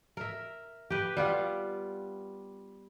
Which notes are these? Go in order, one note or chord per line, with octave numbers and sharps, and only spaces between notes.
A#4 E5
G4 B4
G3 B3 F4